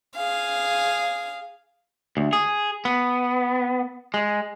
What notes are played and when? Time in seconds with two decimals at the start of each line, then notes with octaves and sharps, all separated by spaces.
0.16 G#4 F5
2.17 D2
2.33 G#4
2.85 B3
4.14 G#3